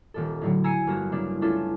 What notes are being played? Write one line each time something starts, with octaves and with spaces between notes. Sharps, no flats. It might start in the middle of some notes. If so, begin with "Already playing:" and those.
D#1 A#2 A4
A2 D3 F#3
G#5 A#5 E6 C7 C#7 D#7
G1 A#3 F#4 A#6 E7
C#3 A#3 D4 E4
A3 C#4 D4 E4 F4 A4